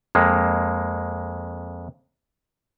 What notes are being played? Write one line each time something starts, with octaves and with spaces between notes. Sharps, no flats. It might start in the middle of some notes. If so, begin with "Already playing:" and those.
F2 G#3 A#3